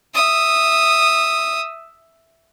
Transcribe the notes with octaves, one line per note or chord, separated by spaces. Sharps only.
E5 D#6